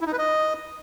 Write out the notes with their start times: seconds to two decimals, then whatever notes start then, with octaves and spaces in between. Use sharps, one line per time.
0.01 E4
0.07 D#4
0.13 B4
0.19 D#5